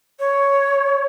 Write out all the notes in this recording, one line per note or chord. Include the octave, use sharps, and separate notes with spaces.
C#5